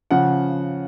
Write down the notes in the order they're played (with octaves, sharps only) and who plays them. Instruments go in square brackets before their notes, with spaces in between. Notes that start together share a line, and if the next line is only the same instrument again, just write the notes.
[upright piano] C#3 F3 F#5